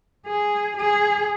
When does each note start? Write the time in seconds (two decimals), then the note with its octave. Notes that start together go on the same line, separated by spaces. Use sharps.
0.27 G#4
0.77 G#4